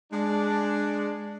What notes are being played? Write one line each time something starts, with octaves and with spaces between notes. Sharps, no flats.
G#3 D4